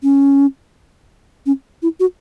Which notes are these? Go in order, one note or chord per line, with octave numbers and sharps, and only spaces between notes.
C#4
C#4
E4
F#4